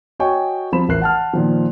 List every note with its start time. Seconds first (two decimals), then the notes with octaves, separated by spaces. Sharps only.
0.19 F#4 C#5 D#5 G5 G#5 C#6
0.73 F3 C4 B5 E7
0.88 A1 E3 A#4 F#6 C7
1.01 F#5 A5 F6
1.33 A#2 D#3 F3